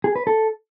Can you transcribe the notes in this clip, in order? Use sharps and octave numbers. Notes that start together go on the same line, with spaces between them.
G#4
B4
A4